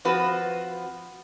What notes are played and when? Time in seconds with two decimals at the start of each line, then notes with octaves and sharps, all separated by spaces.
0.05 F3 C4 F#4 B4